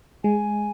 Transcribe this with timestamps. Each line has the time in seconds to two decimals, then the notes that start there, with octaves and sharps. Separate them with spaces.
0.24 G#3 G#5